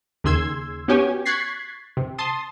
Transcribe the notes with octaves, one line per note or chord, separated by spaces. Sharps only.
D#2 C#3 G#4 C6 E6 G#6
B3 C#4 F#4 G4 C#5 G#5
C#6 F#6 G#6 A6 B6 C7
C3
A5 C6 D#6